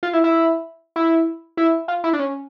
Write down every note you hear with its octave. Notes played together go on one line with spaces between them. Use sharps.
F4
E4
E4
E4
E4
F4
E4
D4
C#4